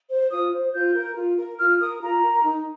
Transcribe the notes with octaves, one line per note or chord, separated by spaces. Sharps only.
C5
F4 D#6
C5
F4 G6
A#4
F4
A#4
F4 F6
A#4 D#6
F4 A#5
A#4
D#4